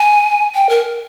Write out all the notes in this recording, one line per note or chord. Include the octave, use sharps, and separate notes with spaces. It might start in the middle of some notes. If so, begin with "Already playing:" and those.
Already playing: G#5
G5
A#4